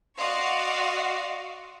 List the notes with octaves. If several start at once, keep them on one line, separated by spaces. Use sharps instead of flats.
F#4 D5 D#5 F5 C6 C#6